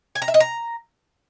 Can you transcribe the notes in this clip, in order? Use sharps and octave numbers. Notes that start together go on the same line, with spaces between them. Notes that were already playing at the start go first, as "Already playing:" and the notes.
G#5
A#5
E5
D#5
A#5